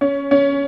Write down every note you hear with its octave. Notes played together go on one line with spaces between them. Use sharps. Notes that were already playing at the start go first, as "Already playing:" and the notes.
C#4
C#4